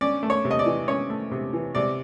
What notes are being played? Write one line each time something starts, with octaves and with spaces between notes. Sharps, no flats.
C#4 D5
A3
C#5
C3
D#5
D5
E3
C#4 C#5
A3
C3
E3
C3 D5